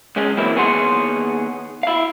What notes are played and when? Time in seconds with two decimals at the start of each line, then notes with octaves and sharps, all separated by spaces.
0.16 C#2 G#3 C#4 G#4
0.37 E3 F#3 A#3 C4 E4
0.55 D#2 B3 G#4 C#5 F#5 C6
1.83 E4 F5